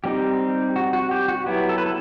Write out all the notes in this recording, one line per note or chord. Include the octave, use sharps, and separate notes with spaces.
G3 C4 D#4 G4
F#4
F#4
G4
F#4
F#3 B3 E4 G4
A4
B4
A4